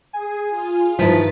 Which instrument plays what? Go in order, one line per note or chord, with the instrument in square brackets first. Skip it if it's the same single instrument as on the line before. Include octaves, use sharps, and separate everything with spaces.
[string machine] G#4 [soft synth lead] G#5
[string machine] F4
[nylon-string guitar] G2 D#3 E4 [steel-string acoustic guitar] F3 [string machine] A6 [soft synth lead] B6